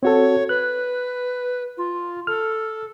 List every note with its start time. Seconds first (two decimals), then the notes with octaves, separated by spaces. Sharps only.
0.03 C4 F#4 A4 C#5
0.49 B4 F#6
1.78 F4
2.27 A4 F6